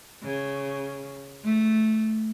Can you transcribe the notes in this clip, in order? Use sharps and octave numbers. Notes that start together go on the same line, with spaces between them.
C#3
A3